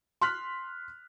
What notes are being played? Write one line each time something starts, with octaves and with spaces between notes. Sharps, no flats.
C6 F6 F#6 B6